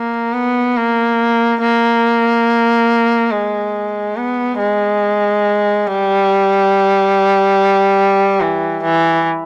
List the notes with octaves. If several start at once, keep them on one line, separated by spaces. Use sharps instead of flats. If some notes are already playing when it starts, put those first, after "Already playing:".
Already playing: A#3
B3
A#3
A#3
G#3
B3
G#3
G3
E3
E3